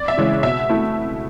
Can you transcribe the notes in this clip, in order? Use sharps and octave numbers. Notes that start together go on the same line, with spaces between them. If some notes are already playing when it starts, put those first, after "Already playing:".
Already playing: D5
E5
C#3 E3 G#3 C#4
B2 E5
A3 E4